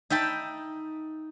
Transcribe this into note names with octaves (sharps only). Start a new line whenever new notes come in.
D#4 E5 G5 A5 B5